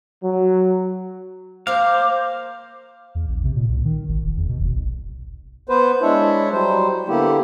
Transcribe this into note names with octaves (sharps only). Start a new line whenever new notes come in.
F#3
A#3 A#4 C5 F5 D6
E2
A#1
C3
A#2
C2
D#3
G#1
F1
E2
B2
F#1
B1
B3 B4 C5
G#3 D4 E4 C#5 E5
F#3 G3 C5
D3 A#3 B3 E4 G4